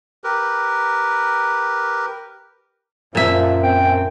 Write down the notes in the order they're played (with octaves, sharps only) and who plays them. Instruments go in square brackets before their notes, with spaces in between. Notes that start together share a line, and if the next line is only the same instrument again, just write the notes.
[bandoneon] G4 A#4 B4
[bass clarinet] F#2 [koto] A#2 E5 [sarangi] F3
[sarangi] C4 [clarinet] G5